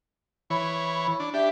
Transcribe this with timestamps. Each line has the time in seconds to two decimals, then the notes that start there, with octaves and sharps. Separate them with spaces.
0.50 E3 C#5 B5
1.20 D4
1.34 D4 G4 E5